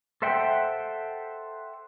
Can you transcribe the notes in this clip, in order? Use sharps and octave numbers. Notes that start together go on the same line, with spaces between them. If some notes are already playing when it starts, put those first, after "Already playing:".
A4 C5 E5 F#5 G5